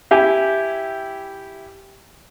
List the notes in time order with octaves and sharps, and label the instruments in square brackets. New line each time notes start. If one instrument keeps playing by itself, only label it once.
[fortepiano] E4 G4 G#5